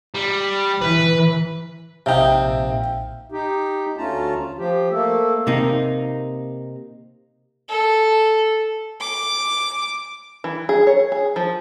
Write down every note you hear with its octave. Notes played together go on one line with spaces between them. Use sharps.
G3
E3 B4
A#1 C3 D#4 E5 F5 G5
D#4 G4
D2 A3 C#4 F4 A5 A#5
F3 G4
A3 A#3 A4
C3 A#3 D#4
A4
D6
E3
G#4
C#5
G#4
F3